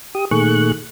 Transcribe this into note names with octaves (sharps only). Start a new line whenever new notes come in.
G4 D#6
A#2 D#3 A3 G#4 C#6 F#6